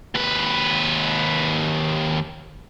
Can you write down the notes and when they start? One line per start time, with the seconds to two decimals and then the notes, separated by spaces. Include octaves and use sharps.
0.15 D#2 B4